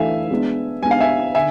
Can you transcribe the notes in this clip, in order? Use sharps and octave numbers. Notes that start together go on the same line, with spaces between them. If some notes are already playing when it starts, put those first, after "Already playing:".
Already playing: E3 A3 D4 A4 E5 F5 G#5
G#3 B3 D4
G#3 B3 D4 G#5
F5
E5 G#5
D3 E5 G#5